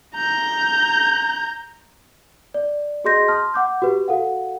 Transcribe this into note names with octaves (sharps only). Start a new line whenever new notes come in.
A#5 G6
D5
F#4 G#4 D#5 C6 G6 A#6
A5 C6 D#6 F6
F#5 D6 G6
F#4 G4 B4
F#4 A4 F5 F#5